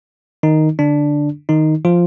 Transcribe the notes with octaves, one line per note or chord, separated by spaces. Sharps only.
D#3 D#4
D3 D4
D#3 D#4
F3 F4